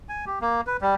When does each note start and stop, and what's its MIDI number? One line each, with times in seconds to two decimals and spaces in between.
0.09 0.25 80
0.26 0.39 67
0.41 0.61 58
0.67 0.77 71
0.81 0.95 55